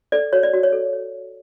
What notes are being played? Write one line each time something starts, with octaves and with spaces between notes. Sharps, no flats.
A4 D5
F#4 C#5
D5
F#4
C#5
A4
C#5